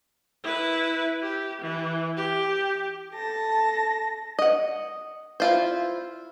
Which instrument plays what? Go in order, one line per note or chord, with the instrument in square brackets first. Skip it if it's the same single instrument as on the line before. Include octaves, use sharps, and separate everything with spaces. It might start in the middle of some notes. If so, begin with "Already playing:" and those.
[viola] E4 B4
G4
E3
G4
[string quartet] A4 A5 A#6
[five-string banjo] D#5 F#5
E4 F4 C5